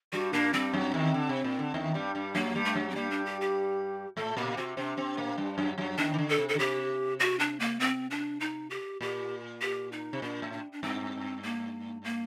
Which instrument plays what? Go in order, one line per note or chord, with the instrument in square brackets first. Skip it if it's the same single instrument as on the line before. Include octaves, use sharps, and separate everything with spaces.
[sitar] G2 G3 [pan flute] F#4
[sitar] A#2 A#3 [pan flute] D4
[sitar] G2 G3 [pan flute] C4
[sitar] F#2 F#3
D#2 D#3
D3
C3
A#2
D3
D#2 D#3
G2 G3
G2 G3
[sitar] F#2 F#3 [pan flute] A#3
[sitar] G2 G3
[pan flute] A3
[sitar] F#2 F#3
[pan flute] C4
[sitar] G2 G3 [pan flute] A#3
[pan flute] D4
G4
G4
[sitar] A2 A3 [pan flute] A4
[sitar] A#2 A#3 [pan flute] G4
[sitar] C3 C4 [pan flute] F#4
[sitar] C3 C4 [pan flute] D4
[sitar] C3 C4
A#2 A#3
G2 G3
F#2 F#3
F#2 F#3
[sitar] D#2 D#3 [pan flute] D4
[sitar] D#3
D3
[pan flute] A4
[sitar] C3
[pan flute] A4
[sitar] D3
[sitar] C3 [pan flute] G4
[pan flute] F#4
D4
A#3
C4
D4
D#4
G4
[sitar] A#2 [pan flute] G4
[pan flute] G4
D#4
[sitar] C3
[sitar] A#2 [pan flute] D4
[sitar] A2
[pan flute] D4
D4
[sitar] G2 [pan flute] C4
[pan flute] A#3
A#3